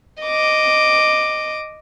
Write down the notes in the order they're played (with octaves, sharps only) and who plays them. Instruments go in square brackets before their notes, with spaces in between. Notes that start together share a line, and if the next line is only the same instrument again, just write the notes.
[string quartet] D#5 D6